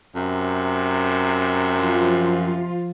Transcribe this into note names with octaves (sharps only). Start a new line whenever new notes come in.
F#2 C3
F3 F4